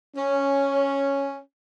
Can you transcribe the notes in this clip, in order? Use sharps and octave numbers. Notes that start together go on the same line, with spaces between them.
C#4